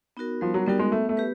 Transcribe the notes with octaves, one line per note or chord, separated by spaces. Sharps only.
B3 D#4 F#4 A#4
F3 G3
F#3
G3 B3 D#4 F#4 A#4
G#3
A3 B3
A3
G4 B4